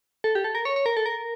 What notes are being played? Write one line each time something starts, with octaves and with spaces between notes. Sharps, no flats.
A4
G4
A4
A#4
C#5
C#5
A#4
A4
A#4